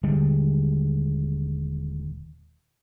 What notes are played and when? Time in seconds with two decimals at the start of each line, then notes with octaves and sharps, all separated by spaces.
0.03 D#1 D3 G3 G#3